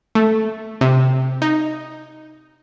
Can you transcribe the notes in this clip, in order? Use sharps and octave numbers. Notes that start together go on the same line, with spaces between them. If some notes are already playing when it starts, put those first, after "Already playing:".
A3
C3
D#4